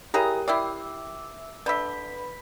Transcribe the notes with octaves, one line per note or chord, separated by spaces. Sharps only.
E4 G4 G#4 A#4 G5 A#5
E4 G4 D5 E5 D6 E6
D3 B4 E5 B5 B6